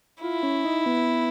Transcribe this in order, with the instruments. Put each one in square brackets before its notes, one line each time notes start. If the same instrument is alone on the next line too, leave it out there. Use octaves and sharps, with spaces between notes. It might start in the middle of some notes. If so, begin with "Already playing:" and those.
[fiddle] E4 [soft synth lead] F4
[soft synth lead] C#4
D#4
B3